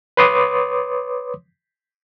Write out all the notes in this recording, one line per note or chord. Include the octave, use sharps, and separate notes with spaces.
B4 C#5 C6 D6 D#6